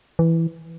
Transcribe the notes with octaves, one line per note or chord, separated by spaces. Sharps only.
E3